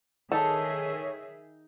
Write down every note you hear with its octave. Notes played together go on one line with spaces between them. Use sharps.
D#3 D#4 G#4 A4 C#5 E5